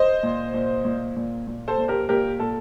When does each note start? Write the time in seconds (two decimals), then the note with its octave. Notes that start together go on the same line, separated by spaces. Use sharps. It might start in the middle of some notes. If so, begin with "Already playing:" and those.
Already playing: C5 D#5
0.23 A#2
0.54 A#2
0.85 A#2
1.16 A#2
1.47 A#2
1.68 A4 C5
1.78 A#2
1.88 G4 A#4
2.09 A#2 G4 A#4
2.39 A#2 A4